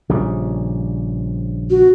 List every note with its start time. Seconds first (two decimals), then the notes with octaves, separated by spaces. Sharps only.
0.09 A#1 C#3 G3
1.70 F#4